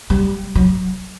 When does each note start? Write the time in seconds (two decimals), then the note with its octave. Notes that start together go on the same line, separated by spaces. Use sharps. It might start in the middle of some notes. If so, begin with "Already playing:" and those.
0.10 G3
0.55 F#3